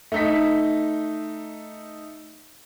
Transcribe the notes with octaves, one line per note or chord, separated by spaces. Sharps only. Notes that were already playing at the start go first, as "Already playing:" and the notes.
A3 D#4 B6